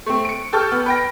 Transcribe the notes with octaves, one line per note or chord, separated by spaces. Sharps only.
A3 C4
C#7 D7
G4 A4 A5 C#6 F6 G6
B3
B4 G5 A#6